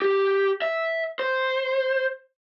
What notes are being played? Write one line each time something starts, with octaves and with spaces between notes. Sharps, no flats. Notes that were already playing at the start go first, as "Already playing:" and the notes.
G4
E5
C5